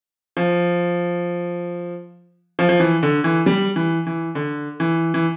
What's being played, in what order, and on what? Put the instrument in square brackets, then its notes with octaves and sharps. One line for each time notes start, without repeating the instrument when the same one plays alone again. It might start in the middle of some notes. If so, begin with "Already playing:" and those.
[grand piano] F3
F3
F3
E3
D3
E3
G3
E3
E3
D3
E3
E3